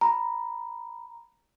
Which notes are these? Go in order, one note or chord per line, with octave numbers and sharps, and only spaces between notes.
A#5 B5